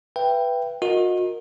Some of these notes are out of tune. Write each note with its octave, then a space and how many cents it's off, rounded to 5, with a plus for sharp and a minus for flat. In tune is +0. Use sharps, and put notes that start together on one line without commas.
B4 +0 E5 +40 G5 +0
F#4 -40 A#4 -10 D#5 +0